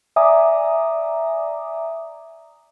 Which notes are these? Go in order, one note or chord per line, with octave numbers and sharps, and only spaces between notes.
D5 E5 G#5 A#5 D6 D#6